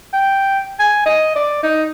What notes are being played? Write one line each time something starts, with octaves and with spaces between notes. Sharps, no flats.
G5
G#5
D#5
D5
D#4